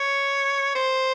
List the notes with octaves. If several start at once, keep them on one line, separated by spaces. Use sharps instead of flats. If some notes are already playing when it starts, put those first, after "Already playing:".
Already playing: C#5
C5